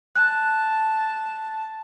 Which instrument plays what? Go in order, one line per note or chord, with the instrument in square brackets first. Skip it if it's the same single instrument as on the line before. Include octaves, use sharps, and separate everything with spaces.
[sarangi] A5 [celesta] F#6